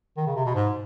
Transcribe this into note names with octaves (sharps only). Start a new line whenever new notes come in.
D#3
C#3
C3
B2
G#2